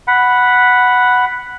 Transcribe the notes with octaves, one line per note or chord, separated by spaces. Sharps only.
F#5 B5